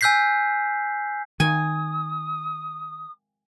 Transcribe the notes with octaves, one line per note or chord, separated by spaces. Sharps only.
G#5 E6 F#6 G6 B6 C7
D#3 G#5 D#6